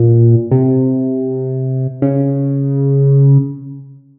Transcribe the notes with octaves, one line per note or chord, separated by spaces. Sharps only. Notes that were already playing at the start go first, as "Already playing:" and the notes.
Already playing: A#2
C3
C#3